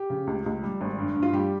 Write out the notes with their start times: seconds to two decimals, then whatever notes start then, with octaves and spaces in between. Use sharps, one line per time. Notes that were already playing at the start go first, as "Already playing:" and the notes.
Already playing: G4
0.10 C#3
0.27 C#2
0.46 C#2
0.63 G3
0.81 G#1
0.98 G2
1.16 G2
1.22 F4
1.33 G3 G4